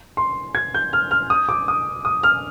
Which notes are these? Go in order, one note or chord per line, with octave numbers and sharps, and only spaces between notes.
C6
G#6
G6
F6
F6
D#6
D6
D#6
D#6
F6